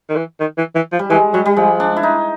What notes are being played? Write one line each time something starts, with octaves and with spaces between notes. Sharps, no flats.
D#3
E3
D#3
E3
E3
F3
G3
E3 G#3
F#3 G3
G3
F3 G#3
D4
E4
D#4